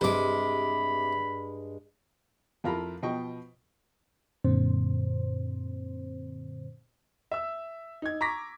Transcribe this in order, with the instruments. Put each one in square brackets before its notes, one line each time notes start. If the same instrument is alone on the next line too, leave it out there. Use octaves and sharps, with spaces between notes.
[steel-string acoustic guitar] G2 G#3 [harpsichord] C3 D6 [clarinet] B5
[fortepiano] F2 E4 F4 A#4 A#5 B5
B2 F3 D#5 G5 C#6
[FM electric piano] F#2 A#2 D3 C4 C5
[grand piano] E5 E6
D#4 G#6
A#5 C#6 D6 A#6 B6